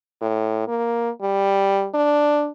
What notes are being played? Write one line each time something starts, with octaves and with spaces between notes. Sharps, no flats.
A2
A#3
G3
D4